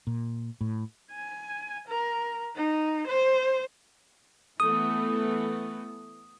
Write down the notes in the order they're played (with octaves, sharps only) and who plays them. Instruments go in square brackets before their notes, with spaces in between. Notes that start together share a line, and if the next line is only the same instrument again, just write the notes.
[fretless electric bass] A#2
A2
[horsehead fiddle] G#5
A#4
D#4
C5
[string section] E3 A3 B3 [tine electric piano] D#6